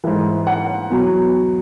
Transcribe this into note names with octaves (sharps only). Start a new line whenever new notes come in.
G#2 E3
F#5
E2 B2 F#3